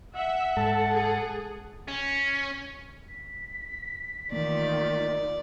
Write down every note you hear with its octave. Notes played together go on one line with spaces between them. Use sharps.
E5 F#5
G#2 A4
G#4
C#4
B6
D#3 E3 A3 A#3 D#4 F4 D5